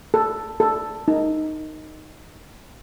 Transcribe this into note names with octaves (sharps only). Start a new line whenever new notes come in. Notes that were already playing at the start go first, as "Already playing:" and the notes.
A4
A4
D#4